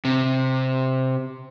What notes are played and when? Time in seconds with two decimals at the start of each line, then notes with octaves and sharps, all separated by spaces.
0.05 C3